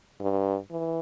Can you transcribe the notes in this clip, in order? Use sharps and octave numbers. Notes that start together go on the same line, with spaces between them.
G2
E3